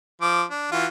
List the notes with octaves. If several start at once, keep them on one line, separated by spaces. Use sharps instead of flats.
F3 D6
D4
E3 F4 F#4